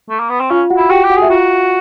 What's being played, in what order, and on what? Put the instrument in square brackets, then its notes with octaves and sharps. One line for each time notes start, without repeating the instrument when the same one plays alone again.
[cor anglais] A3
A#3
B3
C4
[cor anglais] C#4 [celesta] F4 F5
[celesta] F#4 F#5
[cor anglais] E4
[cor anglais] F#4 [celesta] G4 G5
[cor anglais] G4
[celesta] F#4 F#5
[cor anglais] G#4
[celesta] E5
[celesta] F4 F5 [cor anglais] F#4